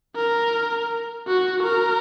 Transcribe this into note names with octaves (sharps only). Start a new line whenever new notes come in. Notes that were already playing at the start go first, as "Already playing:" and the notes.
A#4
F#4
A#4